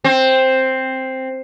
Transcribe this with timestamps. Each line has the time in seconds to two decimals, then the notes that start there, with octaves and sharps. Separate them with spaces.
0.04 C4